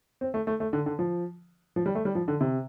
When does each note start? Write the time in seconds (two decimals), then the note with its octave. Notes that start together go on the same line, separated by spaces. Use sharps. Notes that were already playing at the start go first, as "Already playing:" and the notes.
0.21 C4
0.34 A3
0.47 A3
0.60 A3
0.73 D3
0.86 D3
0.99 F3
1.76 F3
1.86 G3
1.95 A3
2.05 G3
2.15 F3
2.28 D3
2.41 C3